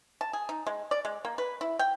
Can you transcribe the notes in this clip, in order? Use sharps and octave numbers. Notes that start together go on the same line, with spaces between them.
A5
G#4
D#4
G#3
D5
G#3
A#3
B4
E4
G5